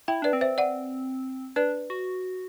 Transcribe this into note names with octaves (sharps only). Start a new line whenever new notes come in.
E4 E5 G5
D4 B4 D5
C4
C5 E5
D5 F#5
D4 B4 D5
F#4